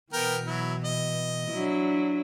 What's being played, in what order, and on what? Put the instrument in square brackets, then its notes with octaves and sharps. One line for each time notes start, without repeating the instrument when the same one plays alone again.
[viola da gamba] B2 E3 [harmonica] B3 A#4 G5
[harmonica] F#3 E4
D#5
[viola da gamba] F#3 D4 E4